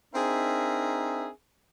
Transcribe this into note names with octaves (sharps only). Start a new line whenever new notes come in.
C4 D4 D#4 G#4 A#4 E5